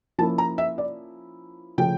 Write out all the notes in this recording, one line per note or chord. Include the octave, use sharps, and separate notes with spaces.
F3 A#3 C#4 E4 A5
A#5
E5
D5
C#3 F3 A3 G5